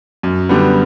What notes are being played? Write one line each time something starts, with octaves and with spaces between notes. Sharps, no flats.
F#2
D3 G3 B3